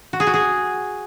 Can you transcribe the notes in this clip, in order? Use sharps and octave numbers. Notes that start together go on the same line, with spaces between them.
F#4
G#4
F#4
G#4